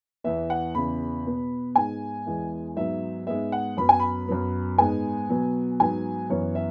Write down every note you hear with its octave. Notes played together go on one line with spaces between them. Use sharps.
E2 E3 B3 E5
F#5
E2 C#3 E3 B5
B2 B3
G#2 G#3 B3 G#5
E2 E3 G#3 B3
G#2 F#3 B3 E5
G#2 G#3 B3 E5
F#5
F#2 F#3 B3 B5
G#5
B5
F#2 F#3 B3
G#2 G#3 B3 G#5
B2 F#3 B3
G#2 F#3 B3 G#5
F#2 E3 B3 C#5
E5